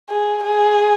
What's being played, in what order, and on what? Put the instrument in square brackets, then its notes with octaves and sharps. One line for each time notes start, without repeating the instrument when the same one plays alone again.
[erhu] G#4
G#4